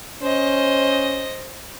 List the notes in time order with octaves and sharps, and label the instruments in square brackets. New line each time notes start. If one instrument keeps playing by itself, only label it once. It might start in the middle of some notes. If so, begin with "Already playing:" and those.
[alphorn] C#4 [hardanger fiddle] C5 D#5